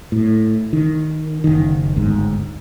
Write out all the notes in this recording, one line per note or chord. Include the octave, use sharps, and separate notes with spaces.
A2
D#3
F#1 D#3
G1 D2 G#2